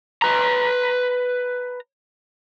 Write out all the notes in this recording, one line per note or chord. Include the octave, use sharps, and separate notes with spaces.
B4 A#5